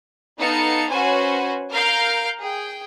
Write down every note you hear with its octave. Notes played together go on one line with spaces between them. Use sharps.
B3 D#4 A4 F5 C#7
C#4 F#4 B4 C5 G#5
A#4 F5 F6 G6 C7 D7
G#4 G5